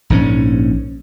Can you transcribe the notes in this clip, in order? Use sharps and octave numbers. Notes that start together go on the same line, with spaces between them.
A#1 G#2 F3 C#4